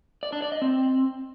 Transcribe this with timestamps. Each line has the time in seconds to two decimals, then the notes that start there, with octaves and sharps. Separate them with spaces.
0.23 D5
0.32 D4
0.42 D5
0.52 D#5
0.62 C4